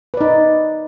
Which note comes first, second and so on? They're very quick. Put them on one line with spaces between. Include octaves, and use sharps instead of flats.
B4 D5 D#4